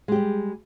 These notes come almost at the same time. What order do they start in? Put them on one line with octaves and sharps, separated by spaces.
G#3 G4 G3